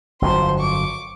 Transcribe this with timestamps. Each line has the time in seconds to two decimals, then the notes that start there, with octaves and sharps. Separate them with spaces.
0.22 G1 F2 F#3 C5 C6
0.59 C#6 D6